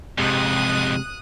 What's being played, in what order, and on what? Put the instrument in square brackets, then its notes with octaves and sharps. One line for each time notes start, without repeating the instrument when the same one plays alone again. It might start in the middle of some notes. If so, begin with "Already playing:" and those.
[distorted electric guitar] F2 G#2 [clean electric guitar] C3 G#3 G4 [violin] D#6 F#6